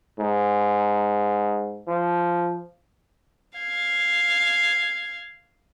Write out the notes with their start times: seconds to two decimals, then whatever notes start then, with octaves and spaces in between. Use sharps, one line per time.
0.19 G#2
1.87 F3
3.59 F5 G#6